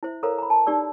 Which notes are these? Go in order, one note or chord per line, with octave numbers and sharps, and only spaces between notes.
E4 C5 E5
A4 A#4 C5 C#5 F5 A#5
A#5 B5
A5
D#4 G4 D5 E6